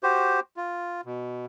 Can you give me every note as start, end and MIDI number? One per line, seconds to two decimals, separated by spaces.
0.03 0.40 66
0.03 0.40 67
0.03 0.40 72
0.57 1.01 65
1.05 1.46 47